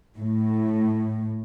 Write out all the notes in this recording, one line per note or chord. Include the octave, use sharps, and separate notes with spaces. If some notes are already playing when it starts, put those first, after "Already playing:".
A2